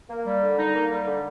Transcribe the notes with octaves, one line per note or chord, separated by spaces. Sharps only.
A#3
G3
D3
D#4
A#3
G3
D3